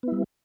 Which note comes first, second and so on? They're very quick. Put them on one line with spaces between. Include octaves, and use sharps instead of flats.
B3 E4 G3